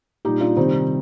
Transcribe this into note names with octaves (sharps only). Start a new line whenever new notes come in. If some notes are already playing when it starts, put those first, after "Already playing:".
A#2 G3 D#4 G4
D4 F4
C3 D#3 G3 C4 D#4